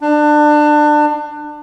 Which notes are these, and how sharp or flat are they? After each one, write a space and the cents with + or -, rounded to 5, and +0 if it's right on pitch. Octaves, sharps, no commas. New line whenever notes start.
D4 +25